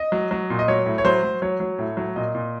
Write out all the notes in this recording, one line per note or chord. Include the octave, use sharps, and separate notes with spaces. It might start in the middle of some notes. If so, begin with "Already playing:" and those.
Already playing: D#5
F#3
F#3
A#2
D#5
F#3 C#5
A2
C#5
F#3 C5
F#3
F#3 C#5
F#3
A2
F#3
A#2 D#5
A#2